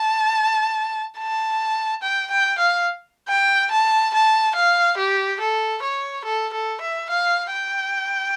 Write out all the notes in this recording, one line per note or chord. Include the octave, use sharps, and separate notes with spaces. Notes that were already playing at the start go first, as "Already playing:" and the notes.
Already playing: A5
A5
G5
G5
F5
G5
A5
A5
F5
G4
A4
C#5
A4
A4
E5
F5
G5